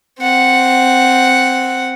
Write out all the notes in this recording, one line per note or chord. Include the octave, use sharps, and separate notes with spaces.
C4 F#5